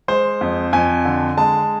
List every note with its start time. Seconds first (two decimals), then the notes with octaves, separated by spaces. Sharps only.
0.08 G#3 C5
0.41 F2
0.73 F2 G#5
1.05 D3
1.38 G#3 A5